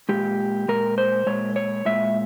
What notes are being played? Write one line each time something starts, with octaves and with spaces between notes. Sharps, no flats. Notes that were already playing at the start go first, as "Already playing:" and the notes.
A#2 G#3 G4
A#2 G#3 A#4
C5
A#2 G#3 C#5
C#5
A#2 G#3 E5